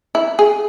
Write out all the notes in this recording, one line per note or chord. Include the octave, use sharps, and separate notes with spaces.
E4
G#4